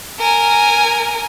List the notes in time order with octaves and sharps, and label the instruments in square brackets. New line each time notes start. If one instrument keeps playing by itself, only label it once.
[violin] A#4 G#5